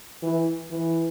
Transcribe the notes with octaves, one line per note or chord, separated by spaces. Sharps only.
E3
E3